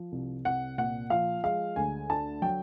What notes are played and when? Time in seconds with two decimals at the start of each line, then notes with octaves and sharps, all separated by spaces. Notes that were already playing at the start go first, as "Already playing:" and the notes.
Already playing: F3
0.12 C2
0.45 C2 F#5
0.78 A#2 F#5
1.10 F3 F5
1.44 G#3 F5
1.76 D2 G#5
2.10 D3 A5
2.42 F#3 G5